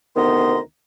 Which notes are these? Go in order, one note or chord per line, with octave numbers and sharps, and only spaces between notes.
D2 C3 D#3 B3 A#5 C6